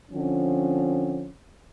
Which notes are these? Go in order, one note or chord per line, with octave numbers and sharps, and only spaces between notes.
D3 F3 C4 C#4